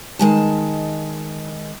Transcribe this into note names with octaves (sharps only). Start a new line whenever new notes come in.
D#3 G#3 A5